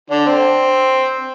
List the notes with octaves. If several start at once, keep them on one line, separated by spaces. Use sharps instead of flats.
D3 D4
C4